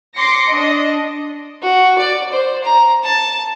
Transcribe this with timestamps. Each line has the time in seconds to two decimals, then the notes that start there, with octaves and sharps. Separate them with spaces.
0.16 C6 D6 A#6 C7 C#7
0.48 D4 D#5
1.62 F#4
1.98 D5
2.32 C5
2.64 A#5
3.04 A5